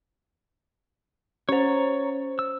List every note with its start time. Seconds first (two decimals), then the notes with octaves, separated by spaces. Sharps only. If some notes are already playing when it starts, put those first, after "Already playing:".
1.49 C#4 C5 C#5 A#5
2.39 E6